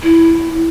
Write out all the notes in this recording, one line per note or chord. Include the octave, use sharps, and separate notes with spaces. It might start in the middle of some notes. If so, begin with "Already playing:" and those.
E4